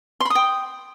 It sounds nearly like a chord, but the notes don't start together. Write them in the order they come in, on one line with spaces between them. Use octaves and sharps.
C6 B5 D#6 G5